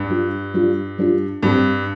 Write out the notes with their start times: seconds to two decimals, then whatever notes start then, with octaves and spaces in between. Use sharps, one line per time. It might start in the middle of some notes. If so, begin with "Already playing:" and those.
Already playing: G2
0.10 G3 D4 F4
0.54 G3 D4 F4
0.98 G3 D4 F4
1.43 G2 G3 C4 G4